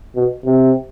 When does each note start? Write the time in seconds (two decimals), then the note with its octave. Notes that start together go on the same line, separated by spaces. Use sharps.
0.16 B2
0.45 C3